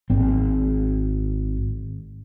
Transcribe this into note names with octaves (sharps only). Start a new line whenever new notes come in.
G#1 C4